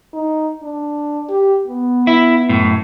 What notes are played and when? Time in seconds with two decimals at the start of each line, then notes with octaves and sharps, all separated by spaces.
0.13 D#4
0.63 D4
1.29 G4
1.67 B3
2.07 E4
2.49 F#2 A2